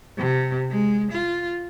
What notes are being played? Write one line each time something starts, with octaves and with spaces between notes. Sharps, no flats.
C3
G#3
F4